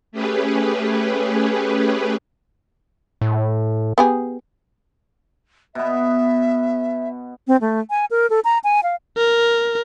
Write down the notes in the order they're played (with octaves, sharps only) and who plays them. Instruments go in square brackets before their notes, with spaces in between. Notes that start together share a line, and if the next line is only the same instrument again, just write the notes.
[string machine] A3 C#4 G4 G#4 B4
[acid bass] A2
[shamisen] B3 G4 G#4
[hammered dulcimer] B2 B3 [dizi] E5
[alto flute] C4
A3
G#5
A#4
A4
A#5
G#5
F5
[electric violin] A#4